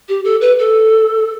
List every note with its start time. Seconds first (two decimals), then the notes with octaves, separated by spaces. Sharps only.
0.09 G4
0.24 A4
0.41 B4
0.59 A4